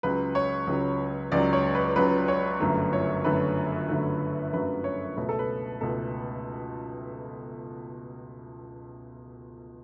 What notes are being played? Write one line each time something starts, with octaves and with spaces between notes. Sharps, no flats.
C#2 C#3 F#3 B4
C#5
C#2 C#3 F#3
C#2 C#3 F#3 D5
C#5
B4
C#2 C#3 F#3 B4
C#5
G1 F#2 D3 F#3 A3
C#5
G1 F#2 D3 F#3 A3 B4
G1 F#2 D3 F#3 A3
G1 F#2 D3 F#3 A3 B4
C#5
C#2 B2 A3 B4
A4
B4
C#2 B2 A3 A4